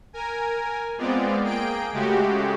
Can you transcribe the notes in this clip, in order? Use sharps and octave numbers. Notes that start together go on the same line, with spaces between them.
A#4 G#5
G#3 B3 C4 F4 D5
A#3 G#4 G5 D7
C#3 G#3 A3 F#4 G4